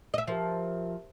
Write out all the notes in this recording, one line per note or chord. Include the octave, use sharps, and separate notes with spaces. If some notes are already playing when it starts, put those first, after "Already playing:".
D#5 E5
F3 G4 A#4 E5